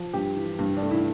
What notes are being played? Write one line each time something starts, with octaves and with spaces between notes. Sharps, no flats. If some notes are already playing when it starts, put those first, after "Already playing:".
Already playing: F3
G2 G4
E3
G2
D4
A3
E4